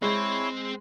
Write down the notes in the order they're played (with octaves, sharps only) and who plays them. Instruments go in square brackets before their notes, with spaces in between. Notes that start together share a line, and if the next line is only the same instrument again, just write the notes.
[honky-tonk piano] G#3 [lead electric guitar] C4 C5 [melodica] E4 C#5